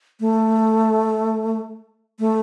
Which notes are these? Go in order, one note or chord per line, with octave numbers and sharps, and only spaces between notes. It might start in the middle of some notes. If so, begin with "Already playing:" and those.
A3
A3